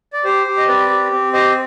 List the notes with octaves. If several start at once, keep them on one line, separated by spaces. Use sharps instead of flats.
D5
G4 C5
G4
D#5
C4 B4 D5
G4
C4
G4 C5 D#5